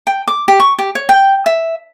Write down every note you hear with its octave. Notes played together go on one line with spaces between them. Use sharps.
G5
D6
G4
C#6
G4
C#5
G5
E5